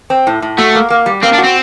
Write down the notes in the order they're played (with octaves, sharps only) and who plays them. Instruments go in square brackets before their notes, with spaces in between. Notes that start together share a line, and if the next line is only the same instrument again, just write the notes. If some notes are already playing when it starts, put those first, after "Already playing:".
[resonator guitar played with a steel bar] C4
A2
A2
[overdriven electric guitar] A3 [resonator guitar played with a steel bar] F#4
[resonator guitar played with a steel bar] A#3
A#3
G3
[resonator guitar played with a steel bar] A#3 [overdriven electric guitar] C4
[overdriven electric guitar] D4
[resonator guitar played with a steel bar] F#4
[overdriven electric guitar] C4